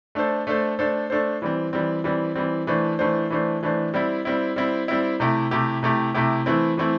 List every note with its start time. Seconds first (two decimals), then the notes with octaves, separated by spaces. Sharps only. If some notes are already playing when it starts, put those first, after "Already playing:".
0.15 A3 D4 A4 C5
0.47 A3 D4 A4 C5
0.79 A3 D4 A4 C5
1.10 A3 D4 A4 C5
1.42 E3 G3 C4
1.73 E3 G3 C4
2.04 E3 G3 C4
2.36 E3 G3 C4
2.67 E3 A3 D4 C5
2.99 E3 A3 D4 C5
3.30 E3 A3 D4 C5
3.63 E3 A3 D4 C5
3.94 G3 C4 E4
4.25 G3 C4 E4
4.56 G3 C4 E4
4.88 G3 C4 E4
5.20 C3 A3 E4 G4
5.51 C3 A3 E4 G4
5.83 C3 A3 E4 G4
6.14 C3 A3 E4 G4
6.46 E3 A3 C4 E4
6.77 E3 A3 C4 E4